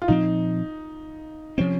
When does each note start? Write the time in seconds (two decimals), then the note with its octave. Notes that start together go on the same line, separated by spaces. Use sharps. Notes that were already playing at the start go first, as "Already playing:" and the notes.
0.02 F4
0.08 A#2 F3 C4 D#4
1.58 C3 F3 C4 C#4